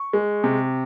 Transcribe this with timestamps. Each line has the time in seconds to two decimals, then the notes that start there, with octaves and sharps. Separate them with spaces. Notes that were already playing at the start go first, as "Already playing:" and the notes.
Already playing: C#6
0.13 G#3
0.44 C3